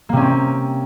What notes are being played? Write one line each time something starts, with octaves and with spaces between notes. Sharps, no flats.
C3 A#3 C4 C#4